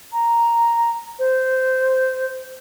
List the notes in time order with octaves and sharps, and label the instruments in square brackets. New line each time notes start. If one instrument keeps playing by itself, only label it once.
[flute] A#5
C5